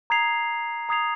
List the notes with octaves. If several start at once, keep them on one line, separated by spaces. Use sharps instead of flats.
A#5 D#6 G#6 C7 F7
A#5 D#6 G#6 C7 F7